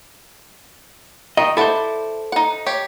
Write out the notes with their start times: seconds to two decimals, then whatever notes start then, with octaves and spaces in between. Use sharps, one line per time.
1.37 D#3 D#5
1.57 E4 A4 C5 D5 F#5
2.32 D#4 F#5
2.66 G4 C#5